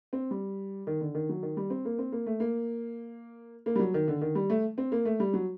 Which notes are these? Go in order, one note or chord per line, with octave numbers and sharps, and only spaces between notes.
C4
G3
D#3
D3
D#3
F#3
D#3
G3
C4
A#3
C4
A#3
A3
A#3
A#3
G3
F#3
D#3
D3
D#3
G3
A3
C4
A#3
A3
G3
F#3